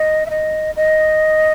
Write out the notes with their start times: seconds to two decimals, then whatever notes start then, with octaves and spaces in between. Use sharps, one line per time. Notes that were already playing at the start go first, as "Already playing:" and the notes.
Already playing: D#5
0.26 E5
0.30 D#5
0.76 D#5